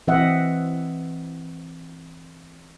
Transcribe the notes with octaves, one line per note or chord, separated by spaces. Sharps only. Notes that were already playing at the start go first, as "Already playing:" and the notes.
E3 C4 D#5 E5 F#5